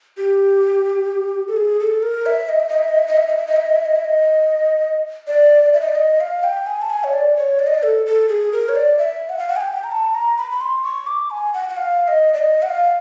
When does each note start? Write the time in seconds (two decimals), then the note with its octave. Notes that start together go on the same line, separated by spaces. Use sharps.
0.17 G4
1.48 A4
1.57 G#4
1.80 A4
2.03 A#4
2.26 E5
2.49 D#5
2.59 E5
2.69 D#5
2.78 E5
2.88 D#5
2.98 E5
3.07 D#5
3.17 E5
3.27 D#5
3.37 E5
3.47 D#5
3.56 E5
3.66 D#5
3.76 E5
3.85 D#5
3.95 E5
4.05 D#5
5.27 D5
5.74 E5
5.81 D#5
5.88 D5
5.95 D#5
6.20 F5
6.44 G5
6.67 G#5
6.82 A5
6.90 G#5
7.04 C#5
7.13 D5
7.37 C#5
7.59 D5
7.67 D#5
7.74 D5
7.83 A4
8.06 A4
8.29 G#4
8.52 A#4
8.69 C#5
8.75 D5
8.98 E5
9.29 F#5
9.39 F5
9.48 F#5
9.56 G#5
9.60 G5
9.84 A#5
9.91 A5
10.15 A#5
10.38 B5
10.51 B5
10.61 C6
10.84 C#6
11.07 D6
11.30 G#5
11.54 F#5
11.69 F#5
11.77 F5
12.08 D#5
12.33 D5
12.38 D#5
12.62 F#5
12.69 F5